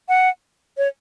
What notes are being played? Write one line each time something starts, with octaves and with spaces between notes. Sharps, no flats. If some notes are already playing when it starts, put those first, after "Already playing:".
F#5
C#5